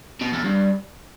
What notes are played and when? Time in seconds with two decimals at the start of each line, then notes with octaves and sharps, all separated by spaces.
0.21 B2
0.33 E2
0.44 G2